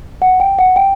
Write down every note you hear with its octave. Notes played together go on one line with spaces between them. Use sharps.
F#5
G5
F#5
G5